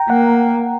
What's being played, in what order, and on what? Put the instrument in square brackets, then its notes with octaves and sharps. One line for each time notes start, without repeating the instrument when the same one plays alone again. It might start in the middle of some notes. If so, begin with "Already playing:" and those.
Already playing: [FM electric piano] G5 A#5
[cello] A#3 [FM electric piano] F#5